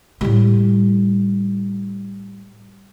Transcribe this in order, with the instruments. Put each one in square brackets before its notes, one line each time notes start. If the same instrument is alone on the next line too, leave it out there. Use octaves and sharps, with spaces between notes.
[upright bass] A2 G3